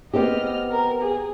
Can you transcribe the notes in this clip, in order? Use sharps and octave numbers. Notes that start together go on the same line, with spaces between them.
B3 C4 G4 D#5 F6
A#4
G#4